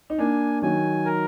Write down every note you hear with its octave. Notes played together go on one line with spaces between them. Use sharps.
D#4
A#3 D4 G#5
D#3 F#3 G#5
A#4